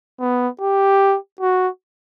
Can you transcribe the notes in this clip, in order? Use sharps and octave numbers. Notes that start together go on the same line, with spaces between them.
B3
G4
F#4